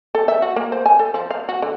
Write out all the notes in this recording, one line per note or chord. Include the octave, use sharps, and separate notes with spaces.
A4
E5
F#4
A#3
C5
G#5
A4
F3
F5
F#4
D3